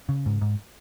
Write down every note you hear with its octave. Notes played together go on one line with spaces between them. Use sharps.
C#3
G#2
G#2